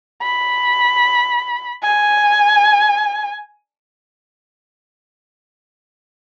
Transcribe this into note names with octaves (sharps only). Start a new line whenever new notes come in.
B5
G#5